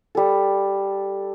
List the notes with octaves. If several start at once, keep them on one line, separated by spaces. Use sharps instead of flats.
G3 A4